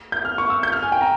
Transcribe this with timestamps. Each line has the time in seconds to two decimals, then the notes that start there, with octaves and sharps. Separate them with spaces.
0.12 G6
0.25 F6
0.38 C#6
0.50 E6
0.63 G6
0.72 F6
0.83 G#5
0.92 G5
1.01 A#5